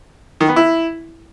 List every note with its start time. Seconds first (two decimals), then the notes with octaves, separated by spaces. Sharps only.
0.41 D#3
0.48 B3
0.56 E4